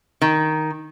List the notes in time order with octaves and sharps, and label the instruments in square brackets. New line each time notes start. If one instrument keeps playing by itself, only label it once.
[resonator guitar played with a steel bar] D#3